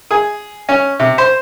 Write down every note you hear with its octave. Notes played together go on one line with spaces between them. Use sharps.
G#4
C#4
C3
C5